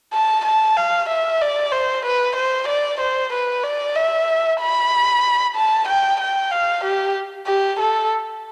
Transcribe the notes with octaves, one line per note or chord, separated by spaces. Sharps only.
A5
A5
F5
E5
D5
C5
B4
C5
D5
C5
B4
D5
E5
B5
A5
G5
G5
F5
G4
G4
A4